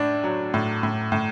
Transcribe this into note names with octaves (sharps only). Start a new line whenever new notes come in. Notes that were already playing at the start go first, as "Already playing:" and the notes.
Already playing: A2 D4
F#3
A2
A2
A2